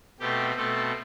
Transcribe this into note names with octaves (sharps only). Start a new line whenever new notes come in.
B2 A3 C4 G4
B2 A3 C4 A4